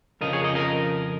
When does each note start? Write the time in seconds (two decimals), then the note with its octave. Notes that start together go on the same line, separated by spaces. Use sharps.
0.21 F2 C#3 F3 A#4 D#5
0.33 G#4 C#5
0.44 A#4 D#5
0.55 A#4 D#5